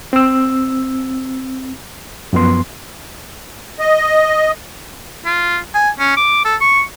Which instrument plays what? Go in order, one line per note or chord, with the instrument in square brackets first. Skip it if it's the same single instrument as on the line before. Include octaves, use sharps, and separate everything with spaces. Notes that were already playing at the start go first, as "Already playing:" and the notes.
[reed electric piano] C4 E6
F#2 F3 B3 C6
[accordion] D#5
[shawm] F4
G#5
C#4
D6
A4
C#6